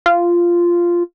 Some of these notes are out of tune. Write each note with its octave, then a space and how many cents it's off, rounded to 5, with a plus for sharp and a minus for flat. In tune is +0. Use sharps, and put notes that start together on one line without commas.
F4 -10